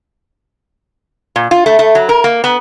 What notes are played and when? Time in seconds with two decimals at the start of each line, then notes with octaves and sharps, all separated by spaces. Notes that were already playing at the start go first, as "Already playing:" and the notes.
1.36 A#2
1.51 F4
1.66 A3
1.79 A3
1.95 F#3
2.09 A#4
2.24 A#3
2.44 B3